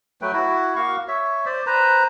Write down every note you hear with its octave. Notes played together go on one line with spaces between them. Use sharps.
F#3 A3 B4 G5
E4 F#4
A#3 F#4 F5 C#6
C#5 E5
C5 D5
B4 C5 A#5